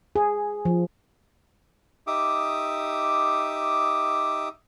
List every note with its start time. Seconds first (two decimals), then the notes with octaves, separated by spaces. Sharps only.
0.16 G#4
0.65 F3
2.07 D#4 G4 E5 D6 D#6